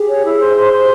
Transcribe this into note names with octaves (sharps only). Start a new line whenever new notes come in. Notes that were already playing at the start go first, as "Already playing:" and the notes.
Already playing: G4 G#4
C#5
E4
C5
C5
C5